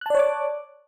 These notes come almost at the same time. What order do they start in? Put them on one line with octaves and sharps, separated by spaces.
F#6 A5 D5 C#5 D6